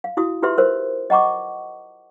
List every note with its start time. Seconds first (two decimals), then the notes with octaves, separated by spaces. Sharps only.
0.04 F5
0.17 E4 F#4 D#6
0.43 F4 G4 B4 E5 C6
0.58 A#4 C5
1.10 D#5 F#5 A#5 C#6 D6